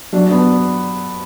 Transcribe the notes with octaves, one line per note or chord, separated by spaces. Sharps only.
F#3 D4
B3 D4